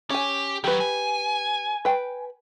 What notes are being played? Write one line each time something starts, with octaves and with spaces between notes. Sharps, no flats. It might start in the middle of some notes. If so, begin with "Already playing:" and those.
C#4 G4 G#5
D#3 F#3 G4 B4
G#5
B4 G5